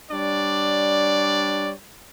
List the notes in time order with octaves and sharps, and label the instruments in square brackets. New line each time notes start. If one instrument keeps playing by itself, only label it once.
[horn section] G3 D4 C#5 D5